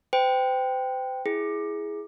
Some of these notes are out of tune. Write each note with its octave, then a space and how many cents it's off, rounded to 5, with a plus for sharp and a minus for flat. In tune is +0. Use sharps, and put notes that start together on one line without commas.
C5 -40 G5 +0
E4 +0 G#4 +5